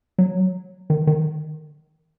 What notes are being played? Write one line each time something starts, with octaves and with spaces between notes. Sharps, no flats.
F#3
D#3
D#3